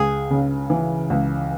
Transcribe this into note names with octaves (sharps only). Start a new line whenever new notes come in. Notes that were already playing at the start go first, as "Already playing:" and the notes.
Already playing: C#2 G#4
C#3
E3
C#2